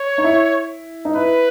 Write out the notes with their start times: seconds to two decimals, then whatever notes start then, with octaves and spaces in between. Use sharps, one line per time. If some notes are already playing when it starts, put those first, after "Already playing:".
Already playing: C#5
0.18 D#4
0.24 E4
1.05 D#4
1.16 E4 B4